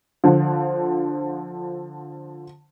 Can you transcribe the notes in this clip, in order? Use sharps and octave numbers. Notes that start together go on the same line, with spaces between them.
D3 F3